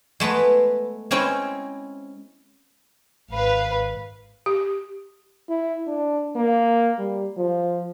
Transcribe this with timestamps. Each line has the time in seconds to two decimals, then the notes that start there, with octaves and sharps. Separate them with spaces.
0.20 G#3 A3 B3 B4
1.11 G#3 C4 C#4 E4
3.31 G#1 B4 F5
4.46 G4
5.49 E4
5.87 D4
6.36 A#3
6.98 G3
7.37 F3